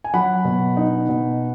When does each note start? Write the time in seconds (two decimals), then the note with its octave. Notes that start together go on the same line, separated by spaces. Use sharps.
0.04 G#5
0.13 F#3 F#5 B5
0.45 B2
0.77 D#4
1.09 B2